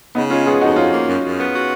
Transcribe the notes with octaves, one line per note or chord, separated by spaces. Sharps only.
C#3 B3 D#4
G#3 C#4 F4
B3 F4 G#4
F2 D#4 F#4
F3 C#4 F4
A#3
F#2
F#2
B3
F#4